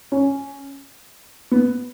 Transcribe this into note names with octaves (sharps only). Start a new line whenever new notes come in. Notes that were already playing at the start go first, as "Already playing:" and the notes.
C#4
B3